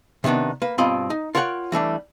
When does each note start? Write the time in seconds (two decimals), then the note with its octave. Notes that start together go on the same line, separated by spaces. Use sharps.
0.24 C3 D#3 B3 D4 D#4
0.62 A#3 B4
0.78 G2 B2 C4 F4 D#5 B5
1.10 D#4
1.35 F4 A#4 C#5 D5 F#5 G5
1.72 E3 G3 A3 D4